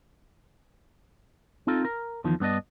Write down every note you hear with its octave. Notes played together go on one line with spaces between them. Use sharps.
C4 D#4 F4 A4
A#4
E2 D#3 F3
G2 B3 D4 D#5